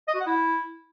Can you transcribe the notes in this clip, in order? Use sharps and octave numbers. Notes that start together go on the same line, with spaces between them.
D#5
F#4
F#5
E4